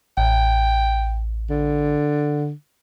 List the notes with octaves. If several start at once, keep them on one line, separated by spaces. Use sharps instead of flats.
A1 G5
D3